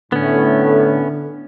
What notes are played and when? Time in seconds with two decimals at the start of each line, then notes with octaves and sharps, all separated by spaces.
0.12 A2 D3 B3 C#4